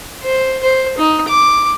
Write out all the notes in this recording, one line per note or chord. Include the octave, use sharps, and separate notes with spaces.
C5
C5
D#4
D6